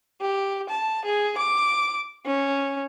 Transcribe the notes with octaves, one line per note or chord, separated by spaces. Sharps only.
G4
A5
G#4
D6
C#4